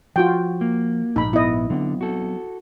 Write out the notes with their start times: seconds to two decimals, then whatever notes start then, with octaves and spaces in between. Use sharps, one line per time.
0.16 F3 F4 F#4 G5
0.61 A#3
1.16 A#1 G#2 D#4 B5
1.33 B3 E4 D#5
1.70 D3 F#3 B3 C4
2.01 F#4 A4